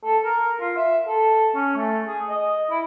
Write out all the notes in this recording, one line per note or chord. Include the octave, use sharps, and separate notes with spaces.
A4
A#4
F4
E5
A4
C#4
A3
G#4
D#5
E4